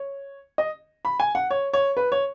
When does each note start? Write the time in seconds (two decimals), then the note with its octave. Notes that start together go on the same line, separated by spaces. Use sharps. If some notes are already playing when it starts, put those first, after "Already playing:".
Already playing: C#5
0.58 D#5
1.05 B5
1.20 G#5
1.35 F#5
1.50 C#5
1.73 C#5
1.97 B4
2.12 C#5